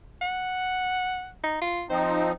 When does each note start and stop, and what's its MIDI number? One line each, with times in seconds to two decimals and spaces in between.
0.21 1.30 78
1.44 1.58 63
1.61 1.84 65
1.90 2.32 53
1.90 2.32 60
1.90 2.32 63
1.90 2.29 72